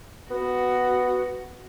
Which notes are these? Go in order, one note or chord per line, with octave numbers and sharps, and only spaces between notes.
B3 F#4